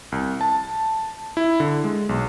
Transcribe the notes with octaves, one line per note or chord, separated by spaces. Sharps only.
C2
A5
E4
D3
G#3
B1